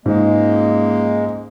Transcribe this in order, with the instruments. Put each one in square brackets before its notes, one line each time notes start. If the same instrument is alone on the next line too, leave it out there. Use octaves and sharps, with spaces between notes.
[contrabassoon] C#2 [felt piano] G#2 [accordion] G#3 [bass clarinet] A#3